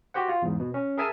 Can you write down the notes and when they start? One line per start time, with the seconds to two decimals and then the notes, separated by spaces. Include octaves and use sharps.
0.14 F#4 G4 C5 F#5
0.28 F4
0.42 E2 G#2
0.60 B2
0.74 C#4
0.97 G#4 A#4 E5 G#5 A5